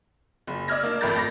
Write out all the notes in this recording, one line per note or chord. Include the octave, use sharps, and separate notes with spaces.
F#1
D5 D#5 E6 F6 G#6 A#6
A#3 D4
G#1 F2 A3 A#4 G6 A6
B5 A6 A#6